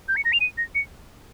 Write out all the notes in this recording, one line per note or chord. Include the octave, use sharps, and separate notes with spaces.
G6
C#7
A#6
F7
D#7
A#6
C#7